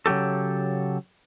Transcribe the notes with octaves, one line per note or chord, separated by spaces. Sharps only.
C#3 F#3 A#3 G4 A4